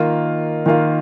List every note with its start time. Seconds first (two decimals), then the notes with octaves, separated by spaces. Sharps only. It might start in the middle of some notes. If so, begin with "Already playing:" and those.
Already playing: D#3 A#3 F4
0.66 D#3 A#3 F4